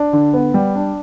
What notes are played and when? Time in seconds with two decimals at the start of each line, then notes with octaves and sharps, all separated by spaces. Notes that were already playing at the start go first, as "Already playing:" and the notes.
Already playing: D4
0.13 D3
0.34 B3
0.54 G3
0.75 D4